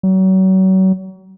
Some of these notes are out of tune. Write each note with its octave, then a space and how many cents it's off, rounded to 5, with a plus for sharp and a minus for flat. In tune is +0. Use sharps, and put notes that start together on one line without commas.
F#3 +35